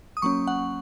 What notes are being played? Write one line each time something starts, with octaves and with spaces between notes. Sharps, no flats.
D#6
F#3 A#3 C#4 C#6
F#5